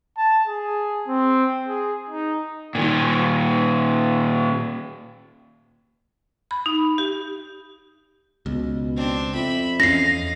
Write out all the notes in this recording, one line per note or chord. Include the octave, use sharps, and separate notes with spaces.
A5
G#4
C4
G#4
D#4
A#2 D#3
B5
D#4
G4
C#2 B2
C4 D4
F2 E5 B5
E2 C#4 D#5 F5 A#6 C7